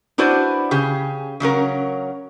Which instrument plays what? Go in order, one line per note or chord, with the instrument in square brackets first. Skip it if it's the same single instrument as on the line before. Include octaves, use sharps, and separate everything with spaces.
[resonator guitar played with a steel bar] D4 E4 F#4 B4 C5 D5
C#3 G4 G#4
C#3 F#3 C#4 A#4